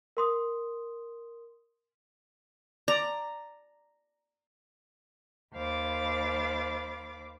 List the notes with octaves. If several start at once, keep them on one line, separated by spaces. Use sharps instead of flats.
A#4 C6 D#6
D5 A#5
D#2 C5 F5 B5 D6 A6